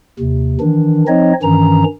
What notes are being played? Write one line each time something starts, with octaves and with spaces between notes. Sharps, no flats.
D#2 C3
D#3 E3 D4
F3 C4 D#4 C#5 D#5
G2 D#3 E3 C#4 A#5